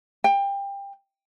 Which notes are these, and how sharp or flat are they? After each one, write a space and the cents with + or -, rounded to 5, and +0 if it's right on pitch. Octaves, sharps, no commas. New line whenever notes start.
G5 +25